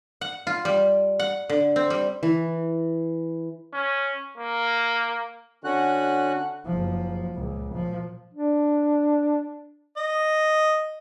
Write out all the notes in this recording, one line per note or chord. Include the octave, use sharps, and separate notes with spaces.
F#5
F4
G3
F#5
D3
C4
G3
E3
C#4
A#3
D3 C#4 F#4 F#5 F#6
F#1 F3
C#2 A#2
A#2 F3
D4
D#5